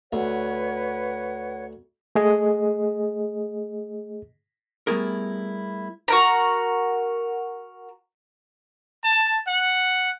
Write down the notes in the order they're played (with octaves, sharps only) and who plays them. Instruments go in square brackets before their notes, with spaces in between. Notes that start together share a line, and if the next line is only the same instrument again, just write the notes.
[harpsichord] D2 [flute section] B4 C#5 F#5
[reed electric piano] A3 G#4 D#5
[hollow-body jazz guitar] G3 A3 B3 E4 G#4 A#4
[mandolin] F#4 A#4 A#5
[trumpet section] A5
F#5